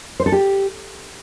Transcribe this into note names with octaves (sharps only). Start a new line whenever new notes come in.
C5
A4
G4